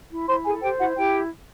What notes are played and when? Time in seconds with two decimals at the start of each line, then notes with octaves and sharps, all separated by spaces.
0.11 E4
0.28 E4 C5 C6
0.45 G#4 A4 G#5
0.62 G4 C5 G5
0.79 E4 F#4 F#5
0.96 E4 G4 G5